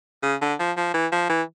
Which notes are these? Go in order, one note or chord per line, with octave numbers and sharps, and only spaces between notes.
C#3
D3
F3
F3
E3
F3
E3